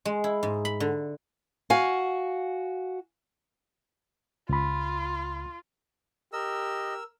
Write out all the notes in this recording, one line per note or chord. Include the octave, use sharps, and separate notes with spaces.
G#3
E4
G#2
B5
D3
F#4 F5 G#5
C#2 F4 B5
G4 A#4 D#5 E6